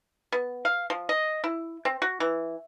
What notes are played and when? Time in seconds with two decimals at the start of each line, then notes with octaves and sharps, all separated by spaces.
0.32 B3
0.65 F5
0.90 F3
1.09 D#5
1.44 E4
1.85 C4
2.02 F#4
2.20 E3